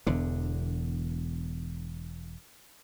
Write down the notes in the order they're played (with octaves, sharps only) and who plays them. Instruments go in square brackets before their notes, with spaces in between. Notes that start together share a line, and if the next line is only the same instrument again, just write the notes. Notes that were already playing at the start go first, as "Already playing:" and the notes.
[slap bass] E1 E2 D3